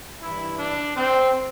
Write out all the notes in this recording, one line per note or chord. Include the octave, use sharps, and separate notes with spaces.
G2 E3 G3 E4
D4
C4